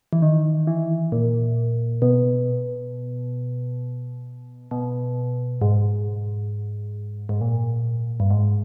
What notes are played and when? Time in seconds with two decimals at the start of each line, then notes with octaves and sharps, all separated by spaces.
0.13 E3
0.22 D#3
0.67 E3
1.12 A#2
2.02 B2
4.71 B2
5.61 G#2
7.29 G#2
7.41 A#2
8.20 G2
8.30 G#2